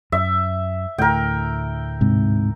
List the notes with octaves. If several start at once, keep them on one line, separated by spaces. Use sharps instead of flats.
F#2 E5
D2 A2 A#4 G5
G#2 C3